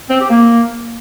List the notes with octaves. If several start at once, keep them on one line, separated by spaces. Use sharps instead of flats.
C4
G4
A#3